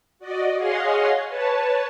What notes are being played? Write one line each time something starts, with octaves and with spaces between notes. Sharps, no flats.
F#4 D5 D#5
G#4 C#5 D#5 F5 F#5 C6
B4 C#5 A5